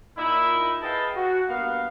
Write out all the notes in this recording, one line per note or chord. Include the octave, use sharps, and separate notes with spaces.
A#2 D#4 E4
G#4 B4 D#5 F5 G5 A5
F#4
G2 A#3 B3 F5